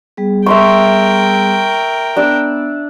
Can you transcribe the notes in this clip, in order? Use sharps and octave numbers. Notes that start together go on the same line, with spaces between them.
G3 B3 G#4
A#4 E5 G5 C6 C#6
B3 D4 D5 E6